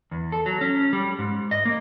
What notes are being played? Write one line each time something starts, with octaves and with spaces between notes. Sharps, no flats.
E2
A4
F#3
C#4
G3
G#2
D#5
A#3